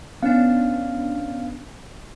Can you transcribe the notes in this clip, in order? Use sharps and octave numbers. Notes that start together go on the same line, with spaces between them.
B3 C#4 D4 F5